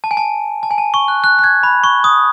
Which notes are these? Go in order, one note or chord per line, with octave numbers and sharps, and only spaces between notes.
A5
G#5
A5
A5
G#5
A5
C#6
F#6
F#6
F#6
G#6
B5
C#6
D#6